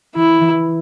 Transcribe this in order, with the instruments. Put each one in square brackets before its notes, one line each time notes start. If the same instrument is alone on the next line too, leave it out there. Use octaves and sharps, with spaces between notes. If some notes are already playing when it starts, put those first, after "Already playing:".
[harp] E3 [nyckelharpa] E4
[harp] E3